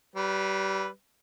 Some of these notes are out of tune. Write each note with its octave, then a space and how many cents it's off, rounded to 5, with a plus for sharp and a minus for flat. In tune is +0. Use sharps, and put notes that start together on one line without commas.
G3 -25 B4 -5